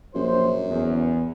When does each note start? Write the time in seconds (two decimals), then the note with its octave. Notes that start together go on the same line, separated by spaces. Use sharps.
0.15 A#1 F#2 C5
0.69 E2